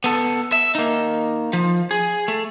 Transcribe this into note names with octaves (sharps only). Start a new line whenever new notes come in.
B3 A4
E5
A#3 D#4
F3
G#4
A3